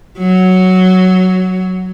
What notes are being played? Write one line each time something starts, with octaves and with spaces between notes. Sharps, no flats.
F#3